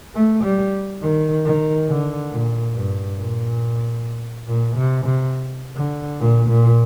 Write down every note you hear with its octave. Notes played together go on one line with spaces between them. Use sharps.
A3
G3
D#3
D#3
D3
A#2
G2
A#2
A#2
C3
C3
D3
A#2
A#2